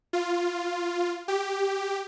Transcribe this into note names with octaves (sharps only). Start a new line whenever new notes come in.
F4
G4